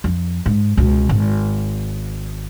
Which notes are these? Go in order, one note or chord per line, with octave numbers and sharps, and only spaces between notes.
F2
G#2
C#2 B2
G#1